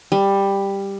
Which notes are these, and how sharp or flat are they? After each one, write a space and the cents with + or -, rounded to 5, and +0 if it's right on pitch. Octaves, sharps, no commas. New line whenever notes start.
G3 +10